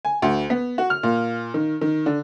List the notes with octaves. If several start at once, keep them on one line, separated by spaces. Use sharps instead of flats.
G#5
D2
B3
F#4
F6
A#2
D#3
D#3
D3